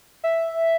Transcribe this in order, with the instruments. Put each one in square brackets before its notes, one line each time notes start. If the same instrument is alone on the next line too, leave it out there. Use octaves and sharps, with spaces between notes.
[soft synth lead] E5